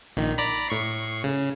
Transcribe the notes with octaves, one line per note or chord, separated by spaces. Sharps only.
A#1 D#3
D5 A#5 B5
A2 C#6 C7
C#3